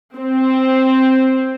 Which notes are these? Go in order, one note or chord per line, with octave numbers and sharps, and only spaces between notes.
C4